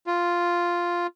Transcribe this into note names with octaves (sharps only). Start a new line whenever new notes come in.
F4